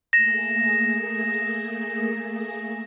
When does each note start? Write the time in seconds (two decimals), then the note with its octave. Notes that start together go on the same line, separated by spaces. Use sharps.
0.13 A3 A#3 G#4 A#6 E7